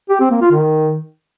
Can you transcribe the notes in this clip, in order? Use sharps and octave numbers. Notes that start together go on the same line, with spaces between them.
G4
C4
A#3
F4
D#3